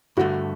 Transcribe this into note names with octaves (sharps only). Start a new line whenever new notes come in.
G2 D3 A3 F#4